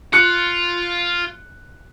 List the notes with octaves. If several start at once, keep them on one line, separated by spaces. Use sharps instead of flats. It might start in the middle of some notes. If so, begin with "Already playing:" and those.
F4 F#6 C#7